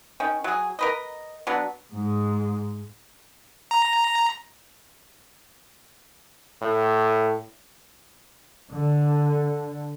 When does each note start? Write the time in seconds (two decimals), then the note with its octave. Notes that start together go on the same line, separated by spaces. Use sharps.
0.20 D#3 C#4
0.44 F#3 G#4
0.79 A#4 B4 D#5
1.47 F#3 B3 D4
1.92 G#2 G#3
3.71 A#5
6.62 A2
8.72 D3